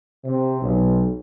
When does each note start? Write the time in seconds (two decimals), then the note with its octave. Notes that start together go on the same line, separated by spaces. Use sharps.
0.24 C3
0.62 B1